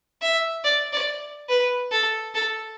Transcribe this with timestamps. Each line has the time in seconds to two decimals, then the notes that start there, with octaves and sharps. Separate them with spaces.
0.22 E5
0.64 D5
0.93 D5
1.49 B4
1.91 A4
2.34 A4